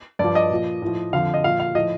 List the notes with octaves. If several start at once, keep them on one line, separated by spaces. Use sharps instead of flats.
G2 F3 D5
D#5
A#2 F3
A2 F3
F2 D3 F3 F5
D#5
A#2 F3 F5
F5
A2 F3 D#5